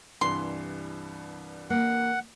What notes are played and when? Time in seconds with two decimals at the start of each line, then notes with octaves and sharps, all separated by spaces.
0.21 C2 G2 E3 C6
1.70 A#3 F#5